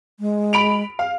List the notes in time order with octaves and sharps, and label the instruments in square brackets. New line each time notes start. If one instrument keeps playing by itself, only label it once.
[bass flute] G#3
[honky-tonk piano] B5 D7 F7
F5